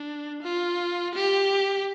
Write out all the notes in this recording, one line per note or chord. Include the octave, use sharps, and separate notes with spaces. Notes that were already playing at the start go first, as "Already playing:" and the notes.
Already playing: D4
F4
G4